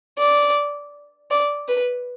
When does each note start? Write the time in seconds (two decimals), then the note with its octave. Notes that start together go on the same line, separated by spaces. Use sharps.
0.19 D5
1.31 D5
1.68 B4